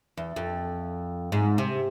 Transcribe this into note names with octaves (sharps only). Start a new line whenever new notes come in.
E2
F2
G#2
C3